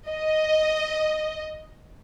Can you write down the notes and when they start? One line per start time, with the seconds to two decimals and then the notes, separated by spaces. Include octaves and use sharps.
0.11 D#5